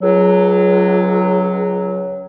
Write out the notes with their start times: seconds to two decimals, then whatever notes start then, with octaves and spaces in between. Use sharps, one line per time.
0.02 C#2 F#3